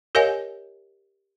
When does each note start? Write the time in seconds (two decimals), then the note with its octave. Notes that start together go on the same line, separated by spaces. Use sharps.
0.15 G4 A#4 C#5 D#5 F5 G#5